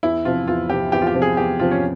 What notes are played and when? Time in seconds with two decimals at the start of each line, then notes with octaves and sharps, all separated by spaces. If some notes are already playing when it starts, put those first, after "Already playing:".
0.03 E2 E4
0.25 C3 F3 C4 F4
0.47 E2 F4
0.69 C3 F3 C4 G4
0.92 E2 G4
1.02 F4
1.07 G4
1.15 C3 F3 C4
1.22 G#4
1.37 E2 G4
1.59 C3 F3 C4 F4
1.71 C#4